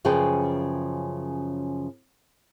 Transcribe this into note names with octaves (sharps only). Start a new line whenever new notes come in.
F#2 C#3 F3 G#4 B4 G5